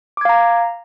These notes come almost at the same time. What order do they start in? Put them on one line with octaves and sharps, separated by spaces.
D6 G#6 F5 A#5